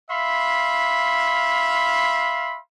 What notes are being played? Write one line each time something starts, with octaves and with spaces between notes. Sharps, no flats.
E5 F5 B5 C6